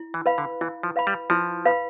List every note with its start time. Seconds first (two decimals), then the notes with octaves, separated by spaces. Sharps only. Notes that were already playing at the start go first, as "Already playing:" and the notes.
Already playing: E4
0.14 E3
0.26 B4 F5 B5
0.38 D3
0.61 E3 E4
0.83 F3
0.96 B4 F5 B5
1.07 G3
1.30 F3 E4
1.65 B4 F5 B5